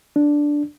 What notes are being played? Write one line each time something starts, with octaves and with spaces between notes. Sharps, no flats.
D4